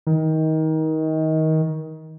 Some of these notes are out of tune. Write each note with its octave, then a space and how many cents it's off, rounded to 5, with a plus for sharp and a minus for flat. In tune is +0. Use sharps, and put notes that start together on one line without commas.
D#3 +25